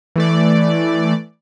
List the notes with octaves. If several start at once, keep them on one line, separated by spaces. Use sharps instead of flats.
E3 A3 D5